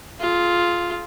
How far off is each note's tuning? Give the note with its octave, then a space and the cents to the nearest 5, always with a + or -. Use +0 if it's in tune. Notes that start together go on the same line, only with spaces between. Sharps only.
F4 +0 G#4 +40